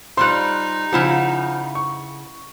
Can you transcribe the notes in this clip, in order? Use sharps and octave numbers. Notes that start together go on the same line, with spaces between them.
G3 D#4 F4 C5 C6 F#6
C#3 F3 E4 F#5
C#6